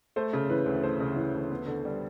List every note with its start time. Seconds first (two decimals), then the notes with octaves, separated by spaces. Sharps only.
0.16 A3 C5
0.33 C#3
0.50 E3 B4
0.66 D2
0.83 A3 C5
1.00 C#3
1.16 E3
1.35 D2
1.51 B3
1.67 D3
1.85 G3